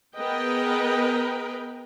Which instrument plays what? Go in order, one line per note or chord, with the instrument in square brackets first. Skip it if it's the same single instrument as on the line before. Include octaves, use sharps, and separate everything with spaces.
[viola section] B3 G#4 A#4 B4 D#5 G5